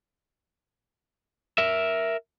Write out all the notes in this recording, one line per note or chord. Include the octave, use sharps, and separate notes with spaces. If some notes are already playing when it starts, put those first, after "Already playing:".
A#4 E5